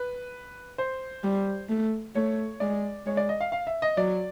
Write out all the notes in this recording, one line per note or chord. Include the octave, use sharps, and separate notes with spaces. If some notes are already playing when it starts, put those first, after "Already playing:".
Already playing: B4
C5
G3
A3
A3 C#5
G#3 D5
G#3 C#5
D5
D#5
F5
F5
E5
D#5
F#3 D5